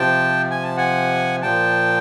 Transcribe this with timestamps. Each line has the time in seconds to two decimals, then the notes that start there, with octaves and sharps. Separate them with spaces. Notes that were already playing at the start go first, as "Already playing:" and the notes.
Already playing: C3 F3 G5 A5
0.51 G#5
0.64 A5
0.77 F#5 G#5
1.42 A#2 F3 G5 A5